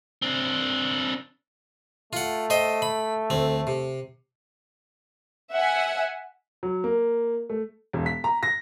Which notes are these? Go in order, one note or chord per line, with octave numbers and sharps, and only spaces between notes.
C4 D4
A3 F4 F#5
C5 D#5 G5
B5
D2 C4
C3
E5 F#5 G#5
F#3
A#3
A3
E1
B6
A#5
A#6